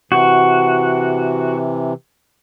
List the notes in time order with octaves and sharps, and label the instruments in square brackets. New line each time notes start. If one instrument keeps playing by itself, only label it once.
[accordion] C3 E3 [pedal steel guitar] F#4